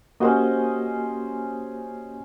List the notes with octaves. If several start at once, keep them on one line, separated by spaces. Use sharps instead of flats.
A#3 C#4 F#4 G4 C5 D#5